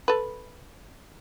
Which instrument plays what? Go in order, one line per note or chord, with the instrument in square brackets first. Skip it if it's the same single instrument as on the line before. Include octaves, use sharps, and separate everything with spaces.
[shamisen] A4 B4